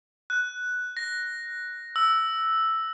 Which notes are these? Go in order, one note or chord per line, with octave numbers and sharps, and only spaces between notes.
F#6
A#6
E6